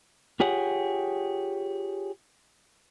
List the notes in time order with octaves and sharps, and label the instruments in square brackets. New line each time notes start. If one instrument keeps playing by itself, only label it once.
[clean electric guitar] F4 G4 G#4 C#5 F#5